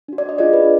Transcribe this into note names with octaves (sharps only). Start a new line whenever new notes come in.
D4 F#4
D5
D#5
D4 F4 G#4 D5
B4